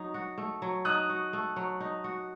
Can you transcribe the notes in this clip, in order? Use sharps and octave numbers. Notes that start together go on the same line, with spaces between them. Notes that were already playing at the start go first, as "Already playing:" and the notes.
Already playing: F#3 D#4
F#4
A3
F#3
D#4 D#6 F#6
F#4
A3
F#3
D#4
F#4